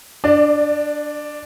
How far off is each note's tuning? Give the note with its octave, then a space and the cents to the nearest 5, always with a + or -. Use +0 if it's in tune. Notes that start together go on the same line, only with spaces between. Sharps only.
D4 +0 D5 +30